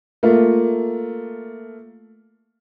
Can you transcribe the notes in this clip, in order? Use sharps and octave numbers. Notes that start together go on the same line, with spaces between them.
A3 A#3 F4